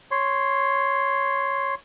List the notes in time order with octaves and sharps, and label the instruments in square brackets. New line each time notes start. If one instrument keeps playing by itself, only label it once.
[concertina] C#5 C6